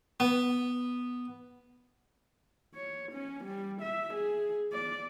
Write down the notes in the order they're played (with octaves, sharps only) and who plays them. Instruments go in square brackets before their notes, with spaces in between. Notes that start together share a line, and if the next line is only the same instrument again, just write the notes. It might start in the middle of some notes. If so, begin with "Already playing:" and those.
[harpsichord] B3
[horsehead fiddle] C#5
C#4
G3
E5
G#4
D5